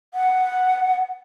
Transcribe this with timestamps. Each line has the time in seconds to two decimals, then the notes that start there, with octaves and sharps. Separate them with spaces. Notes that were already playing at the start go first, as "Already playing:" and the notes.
0.14 F#5